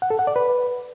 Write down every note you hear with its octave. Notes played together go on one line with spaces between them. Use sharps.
F#5
A4
F#5
D5
B4